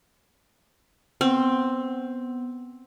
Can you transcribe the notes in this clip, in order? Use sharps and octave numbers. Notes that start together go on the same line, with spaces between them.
B3 C4